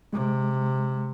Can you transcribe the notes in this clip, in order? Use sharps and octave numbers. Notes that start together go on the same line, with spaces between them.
C3 G#3